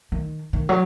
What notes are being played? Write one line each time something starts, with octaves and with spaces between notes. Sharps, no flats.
D#3
D#3
F#3